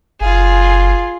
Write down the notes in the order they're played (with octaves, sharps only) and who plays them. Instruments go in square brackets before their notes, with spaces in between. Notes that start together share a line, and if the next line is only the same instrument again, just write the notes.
[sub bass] F#1 [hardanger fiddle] F4 G#4